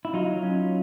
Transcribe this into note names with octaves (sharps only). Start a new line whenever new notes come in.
E4
F#3 D#4 F4
C#4